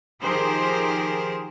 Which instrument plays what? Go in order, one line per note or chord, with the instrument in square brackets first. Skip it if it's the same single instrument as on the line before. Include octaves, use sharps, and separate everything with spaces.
[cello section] D#3 F3 G4 G#4 A#4 C5